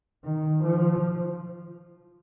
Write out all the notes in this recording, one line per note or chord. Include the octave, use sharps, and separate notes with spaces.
D#3
F3